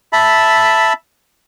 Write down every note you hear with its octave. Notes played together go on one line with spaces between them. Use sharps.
E5 A5 B5